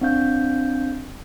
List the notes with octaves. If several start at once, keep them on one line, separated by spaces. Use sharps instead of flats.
C4 D4 F5 G6